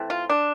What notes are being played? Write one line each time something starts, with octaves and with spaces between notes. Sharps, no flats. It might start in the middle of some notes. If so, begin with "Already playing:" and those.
Already playing: E3 A3 C4
F4
D4